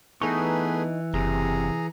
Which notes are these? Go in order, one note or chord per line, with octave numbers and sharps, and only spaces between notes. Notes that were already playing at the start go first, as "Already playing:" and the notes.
E3 A3 B3 D#4 G#4 C#6
F#1 C3 G#4 A#5